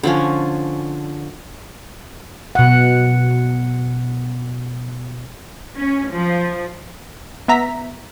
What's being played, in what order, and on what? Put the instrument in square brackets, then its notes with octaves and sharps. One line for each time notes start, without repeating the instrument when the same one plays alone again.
[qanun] D3 F3 C#4
[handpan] B2 F#5
[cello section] C#4
F3
[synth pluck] B3 E5 A#5 B6